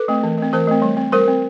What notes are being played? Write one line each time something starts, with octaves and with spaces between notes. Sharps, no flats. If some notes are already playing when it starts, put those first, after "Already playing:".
Already playing: A4 B4
A3 C4
E3
A3 C4
E3 A#4 C5
A3 C4
G3
C4
G3 A#4 C5
C4